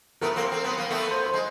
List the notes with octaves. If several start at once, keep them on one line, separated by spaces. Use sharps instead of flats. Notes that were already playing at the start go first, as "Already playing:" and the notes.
A3 B3 A#4
A#3 C4
C4
B3
A#3
A3 B3
C5
C5
G#3